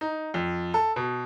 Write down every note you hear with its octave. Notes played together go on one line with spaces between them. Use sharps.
D#4
F2
A4
B2